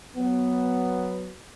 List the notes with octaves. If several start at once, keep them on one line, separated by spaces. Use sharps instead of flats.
F#3 B3